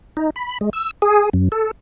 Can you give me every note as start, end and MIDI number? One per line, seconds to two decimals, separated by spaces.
0.17 0.30 63
0.36 0.58 83
0.61 0.70 56
0.73 0.91 88
1.02 1.30 68
1.33 1.49 42
1.52 1.71 69